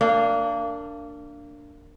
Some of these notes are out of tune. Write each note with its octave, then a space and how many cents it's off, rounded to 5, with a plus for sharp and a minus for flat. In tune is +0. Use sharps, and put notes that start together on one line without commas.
A#3 -25 D4 +0